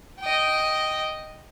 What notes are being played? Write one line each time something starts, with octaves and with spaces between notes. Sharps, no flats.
D#5 G5